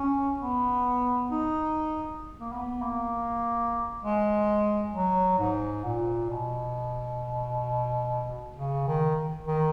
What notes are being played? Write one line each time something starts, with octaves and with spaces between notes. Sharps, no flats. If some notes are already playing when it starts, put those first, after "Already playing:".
Already playing: C#4
B3
D#4
A#3
B3
A#3
G#3
F#3
G#2
A#2
B2
C#3
D#3
D#3